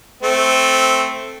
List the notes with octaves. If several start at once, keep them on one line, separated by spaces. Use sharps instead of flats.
A3 C4